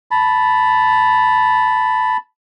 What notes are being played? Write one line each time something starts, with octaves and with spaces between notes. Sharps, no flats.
A5 B5